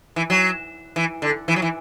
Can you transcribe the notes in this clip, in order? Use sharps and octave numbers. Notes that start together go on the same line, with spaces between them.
E3
F#3
E3
D3
E3
F#3
E3